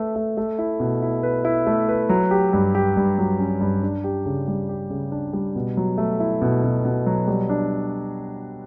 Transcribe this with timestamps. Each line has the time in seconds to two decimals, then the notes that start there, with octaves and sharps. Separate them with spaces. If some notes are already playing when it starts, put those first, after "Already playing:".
Already playing: A3 B4
0.16 A3
0.37 A3
0.59 E4
0.80 B2
1.02 E4
1.23 B4
1.45 E4
1.67 A3
1.89 B4
2.09 F#3
2.31 G4
2.53 G2
2.75 G4
2.97 G2
3.18 F#3
3.39 C#4
3.61 G2
3.83 D4
4.04 G4
4.26 C#3
4.48 G3
4.69 G4
4.90 C#3
5.12 D4
5.33 G3
5.56 B2
5.77 F#3
5.98 A3
6.20 E4
6.42 B2
6.64 B2
6.85 B2
7.06 F#3
7.27 G3
7.49 D4